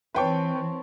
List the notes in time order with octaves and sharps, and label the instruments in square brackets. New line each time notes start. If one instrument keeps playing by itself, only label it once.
[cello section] E3 C4 [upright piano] B4 G5 C#6 [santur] C#5 A5 C6